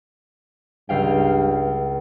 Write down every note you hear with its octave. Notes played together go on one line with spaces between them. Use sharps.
C#2 G2 F5 G5